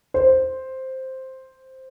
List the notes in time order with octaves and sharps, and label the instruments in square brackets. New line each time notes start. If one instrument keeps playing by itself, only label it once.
[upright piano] C5